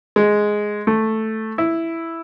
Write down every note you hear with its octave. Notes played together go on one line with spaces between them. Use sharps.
G#3
A3
E4